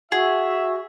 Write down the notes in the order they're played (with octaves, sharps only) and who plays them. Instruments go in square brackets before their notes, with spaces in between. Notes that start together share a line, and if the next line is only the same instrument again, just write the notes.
[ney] F#4 [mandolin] G#4 [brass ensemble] E5 [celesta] F#5